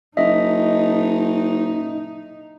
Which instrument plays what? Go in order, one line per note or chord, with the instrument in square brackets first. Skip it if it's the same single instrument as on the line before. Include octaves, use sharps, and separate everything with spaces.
[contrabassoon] F#1 [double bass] D#4 [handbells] D#5 E5